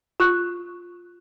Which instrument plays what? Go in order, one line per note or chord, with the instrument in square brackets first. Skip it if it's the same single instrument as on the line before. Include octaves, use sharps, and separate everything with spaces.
[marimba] F4 C#6 F#6